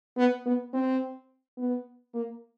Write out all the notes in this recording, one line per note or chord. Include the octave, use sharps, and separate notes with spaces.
B3
B3
C4
B3
A#3